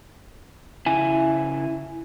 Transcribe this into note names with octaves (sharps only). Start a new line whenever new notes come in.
C#3 E4 G#5